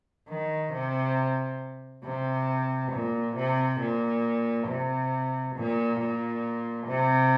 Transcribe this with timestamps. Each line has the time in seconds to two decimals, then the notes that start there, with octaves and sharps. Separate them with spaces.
0.29 D#3
0.73 C3
2.04 C3
2.92 A#2
3.36 C3
3.80 A#2
4.67 C3
5.56 A#2
6.00 A#2
6.87 C3